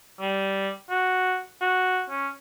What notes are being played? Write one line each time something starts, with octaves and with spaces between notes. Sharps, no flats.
G3
F#4
F#4
C#4